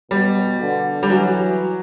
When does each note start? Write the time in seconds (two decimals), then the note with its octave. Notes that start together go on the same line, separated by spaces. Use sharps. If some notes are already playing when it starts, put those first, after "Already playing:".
0.11 B2 G3
0.61 D3
1.03 G3
1.10 E3 F#3